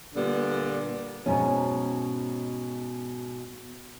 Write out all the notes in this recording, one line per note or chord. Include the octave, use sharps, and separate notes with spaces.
A#2 D3 G3 B3
G#2 B2 C#4